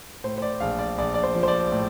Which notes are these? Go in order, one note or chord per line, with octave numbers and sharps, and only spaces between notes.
A2 C5
C5
D5
A#1 F5
D5
A#1 D5
D5
C5
F3
C5
D5
A2